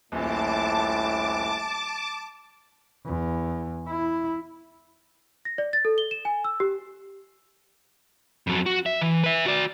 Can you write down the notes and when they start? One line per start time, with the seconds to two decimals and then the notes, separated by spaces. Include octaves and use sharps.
0.12 D#1 A#1 A2 A5 D6
3.06 E2
3.88 E4
5.45 A#6
5.58 D5
5.73 A6
5.85 A4
5.98 G7
6.11 E7
6.25 G#5
6.44 E6
6.60 G4
8.47 F2 F#3
8.66 F#4
8.86 E5
9.02 E3
9.24 B4 E5
9.46 F#4 D5